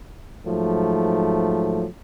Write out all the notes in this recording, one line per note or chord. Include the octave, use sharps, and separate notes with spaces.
G#2 F3 F#3 A3